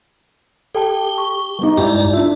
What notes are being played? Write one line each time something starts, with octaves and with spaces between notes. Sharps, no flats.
G4 A4 G5 A5
C#6
G3 B3 D#4
G2 G#3 D#4 E4 G4 D5 A#5
D4 F4 E5